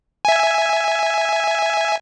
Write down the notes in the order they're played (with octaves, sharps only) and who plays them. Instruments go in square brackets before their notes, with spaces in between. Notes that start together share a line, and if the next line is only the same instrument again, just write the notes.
[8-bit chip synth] E5 G#5